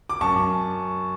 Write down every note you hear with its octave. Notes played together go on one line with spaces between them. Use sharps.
D6
F#2 A5 C#6
F#2